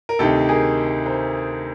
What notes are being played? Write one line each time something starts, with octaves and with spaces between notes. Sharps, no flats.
A#4
D2 C3 D#3 G4 A4
G#4 A#4
A#4 C5